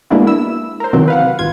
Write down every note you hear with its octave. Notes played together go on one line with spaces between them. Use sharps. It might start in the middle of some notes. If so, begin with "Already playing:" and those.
G#3 A#3 B3 D4 E4 F#4
E4 E6
A#4 C5
C3 D#3 E3 F#3 C4 F#4
B4 F5 F#5
G#1 F4 G#6